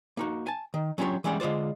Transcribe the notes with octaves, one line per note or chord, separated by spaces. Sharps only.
A#3 D#4 F#4
G#5 A5
D#3
F#3 C#4 D4 F4 G4 C#5
E3 G3 G#3 C#4 D5 F#5
D3 G#3 F4 C5 D5